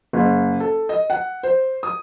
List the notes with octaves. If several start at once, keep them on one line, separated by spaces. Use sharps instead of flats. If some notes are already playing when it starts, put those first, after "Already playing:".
F#1
A4
D#5
F#5
C5
D#6